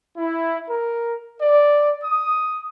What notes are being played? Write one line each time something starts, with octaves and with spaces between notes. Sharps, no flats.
E4
A#4
D5
D#6